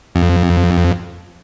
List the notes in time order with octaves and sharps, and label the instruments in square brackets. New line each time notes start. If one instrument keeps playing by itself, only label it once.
[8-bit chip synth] F2